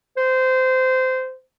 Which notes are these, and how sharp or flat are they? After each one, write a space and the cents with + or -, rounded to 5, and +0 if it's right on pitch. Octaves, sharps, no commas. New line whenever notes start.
C5 -20